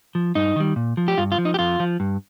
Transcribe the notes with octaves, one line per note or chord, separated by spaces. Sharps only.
F3
G2 D#4
D#3 G3
A#2
F3
G4
G2 F4
F4
F3
D#4
G4
F2 F4
F3
G2